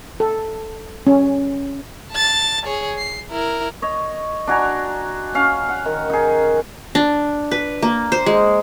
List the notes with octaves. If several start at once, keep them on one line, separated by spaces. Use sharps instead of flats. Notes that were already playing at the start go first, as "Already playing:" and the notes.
A4
C#4
A5 A6
G#4 C#5
C7
E4 A#4
C#5 D#5
D4 F#4 G#5 A#5
C#4 F5
F#5
D#3
D#4 G#4
D4
B4
A#3
C5
G#3